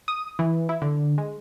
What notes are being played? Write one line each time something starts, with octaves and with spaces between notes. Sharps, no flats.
D#6
E3
E4
D3
G#3